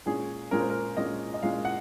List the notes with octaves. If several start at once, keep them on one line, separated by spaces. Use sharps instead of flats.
A#2 G#3 C#4 G#4
A#2 G#3 C#4 A#4
C5
A#4
A#2 G#3 C#4 D#5
D#5
A#2 G#3 C#4 F5
F#5